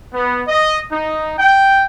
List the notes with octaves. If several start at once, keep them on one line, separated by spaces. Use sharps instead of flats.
B3
D#5
D#4
G5